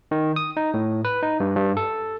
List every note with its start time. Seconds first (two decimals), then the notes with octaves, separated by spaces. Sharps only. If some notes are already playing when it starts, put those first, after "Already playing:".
0.11 D#3
0.36 D#6
0.57 D#4
0.74 A2
1.05 B4
1.23 D#4
1.40 G2
1.56 G2
1.77 A4